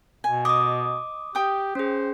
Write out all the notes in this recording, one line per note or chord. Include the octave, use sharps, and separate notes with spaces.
B2 G#5
D#5 D6 D#6
G4 G5 D#6
C#4 G#4 C5